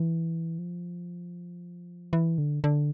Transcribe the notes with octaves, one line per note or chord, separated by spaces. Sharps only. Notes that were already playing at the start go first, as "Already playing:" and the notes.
Already playing: E3
F3
E3
D3
D3